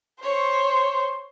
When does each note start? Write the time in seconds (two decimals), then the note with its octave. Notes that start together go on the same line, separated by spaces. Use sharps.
0.22 C5 C#5 C#6